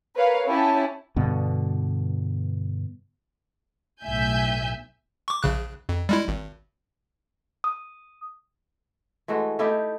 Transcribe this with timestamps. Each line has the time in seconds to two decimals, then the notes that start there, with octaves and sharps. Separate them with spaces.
0.16 A#4 B4 C#5 F5
0.46 C#4 E4 G4 A5
1.16 G2 B2 D3
4.03 B1 A2 E5 G#5 G6
5.28 C#6 D6
5.43 A#1 C#3 F#6
5.89 F2
6.09 G3 G#3 E4
6.28 G#1
7.64 D#6
9.28 E3 G#3 A3 F#4
9.59 A3 D#4 E4 G4